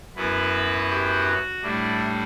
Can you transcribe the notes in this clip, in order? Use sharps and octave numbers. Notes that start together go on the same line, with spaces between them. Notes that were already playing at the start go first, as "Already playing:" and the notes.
F#2 F#3 B3 E4 B4
G4
F#4
A2 G3 D4 E4